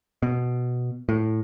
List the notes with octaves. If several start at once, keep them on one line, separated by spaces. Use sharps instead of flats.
B2
A2